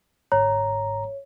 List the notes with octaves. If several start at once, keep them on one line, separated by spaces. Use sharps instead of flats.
G1 G#2 C#5 A#5